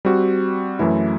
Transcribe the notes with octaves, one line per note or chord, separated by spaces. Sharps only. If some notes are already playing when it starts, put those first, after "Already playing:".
G3 C4 F#4
F#2 E3 A3 E4